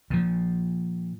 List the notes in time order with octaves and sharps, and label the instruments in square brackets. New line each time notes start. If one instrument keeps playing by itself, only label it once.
[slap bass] A#2 F3